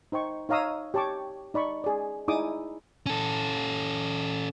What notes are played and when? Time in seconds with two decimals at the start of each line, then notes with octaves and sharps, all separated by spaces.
0.12 D#4 C5 G5 C#6
0.49 D#4 C#5 F5 A#5 D#6 E6
0.94 G4 C#5 A5 C#6 D6
1.54 D#4 D5 B5 C#6
1.84 G#4 D5
2.28 D#4 E4 G#4 D5 D6 D#6
3.06 C#4 A4